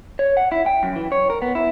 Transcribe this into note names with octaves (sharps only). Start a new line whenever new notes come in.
C#5
F#5
E4
G5
F#2
E3
C#5
A#4
B3
E4